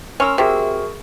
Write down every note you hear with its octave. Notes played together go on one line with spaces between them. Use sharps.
C#4 A#4 C6 E6
C3 F#4 G#4 A#4